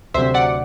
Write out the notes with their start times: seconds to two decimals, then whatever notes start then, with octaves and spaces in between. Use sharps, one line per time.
0.14 D2 C3 F#3 C5 E5
0.34 D5 F#5